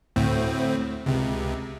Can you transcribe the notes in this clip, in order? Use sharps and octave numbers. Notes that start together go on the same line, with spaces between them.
D2 A2 C4
C#2 C3